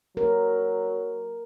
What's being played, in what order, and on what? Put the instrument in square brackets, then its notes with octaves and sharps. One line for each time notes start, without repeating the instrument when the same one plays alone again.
[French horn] F#3 [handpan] A#4